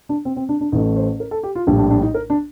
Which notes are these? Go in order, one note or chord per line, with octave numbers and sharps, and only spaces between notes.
D4
C4
C4
D4
D4
A1 A2 A3 D#4
C5
A#4
A4
G4
F4
A#1 A2 G3 D4
D4
D4
D#4
A#4
D4